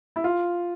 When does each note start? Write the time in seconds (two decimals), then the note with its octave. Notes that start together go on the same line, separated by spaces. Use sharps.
0.16 E4
0.24 F4